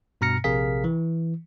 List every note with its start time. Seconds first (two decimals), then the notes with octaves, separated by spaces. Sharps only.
0.21 G2 B2 A#5 F6 A#6 C#7
0.44 A#1 C3 G#4 A#4 F5 B6
0.84 E3